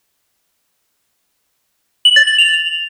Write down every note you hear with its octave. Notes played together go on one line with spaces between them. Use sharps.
F#7
A6
F#7
F7